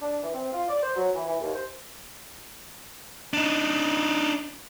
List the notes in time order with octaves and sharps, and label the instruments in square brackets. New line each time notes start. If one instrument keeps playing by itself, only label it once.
[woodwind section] D4
E3
C4
F4
D5
C5
F#3
E3
E3
D#2
C5
[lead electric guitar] D4 D#4